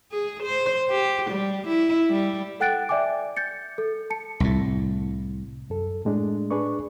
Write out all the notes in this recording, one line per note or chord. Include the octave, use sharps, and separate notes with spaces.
G#4
C5
G4
G3
E4
G3
A4 F#5 G5 F#6 A6 D7
D5 E5 G5 G#5 D6
G6 A6 C#7
A4
A5 C#7
C2 A2
F#2 A4
A2 G#3 D4
D4 G#4 B4 D5 C#6